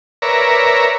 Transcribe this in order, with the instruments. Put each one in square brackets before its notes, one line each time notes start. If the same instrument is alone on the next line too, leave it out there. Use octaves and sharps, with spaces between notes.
[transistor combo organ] A#4 B4 C#5 D5 E5 A#5